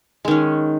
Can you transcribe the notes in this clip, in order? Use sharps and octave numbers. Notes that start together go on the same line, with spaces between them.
D#3 G#3 C#4